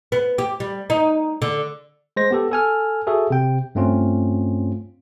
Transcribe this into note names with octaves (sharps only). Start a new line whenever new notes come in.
B3
G4
G3
D#4
D3
G#3 C5 A#6
B3 G4 A4
A4 G#5 F6
F#4 G#4 A4 E5
C3 G5
G2 A3 C4 C#4 F4